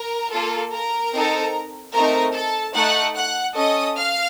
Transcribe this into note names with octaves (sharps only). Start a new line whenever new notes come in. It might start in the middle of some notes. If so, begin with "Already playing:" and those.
Already playing: A#4 A#5
A#3 F4 A4
A#4 A#5
C4 D#4 A4
A3 C4 D#4 A#4 A#5
A4 A5
A3 D#4 A4 F#5 F#6
F#5 F#6
C#4 A4 D#5 D#6
F5 F6